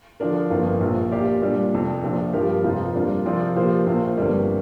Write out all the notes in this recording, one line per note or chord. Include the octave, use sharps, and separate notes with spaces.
D3 F3 D4 A#4
G1 F2 F3 A#3 F4
A#1 A#2 F3
A#2 A#3 G4 D5 F5
A#2 G3 D4
F1 F2 C3
A#1 A#2 F3 D4
G2 F3 A#3 G4 A#4
F1 F2 F3 C4
C3 G3 A#3 D4 F4
C3 F3 C4 A#4 D5
A#2 F3 A#3 G4 C5
A#1 A#2 A#3 F4 C5
G1 F2 D3 G3 A#3